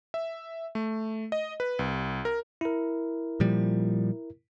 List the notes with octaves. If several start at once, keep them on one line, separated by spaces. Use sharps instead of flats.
E5
A3
D#5
B4
C2
A#4
E4 A#4
A#2 F3 G3